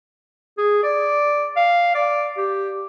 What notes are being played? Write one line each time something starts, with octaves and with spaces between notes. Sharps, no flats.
G#4
D5
F5
D5
G4